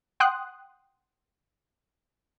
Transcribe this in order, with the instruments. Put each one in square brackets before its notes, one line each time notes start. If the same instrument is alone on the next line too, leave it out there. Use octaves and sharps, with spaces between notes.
[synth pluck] F#5 G5 C6 D#6 F#6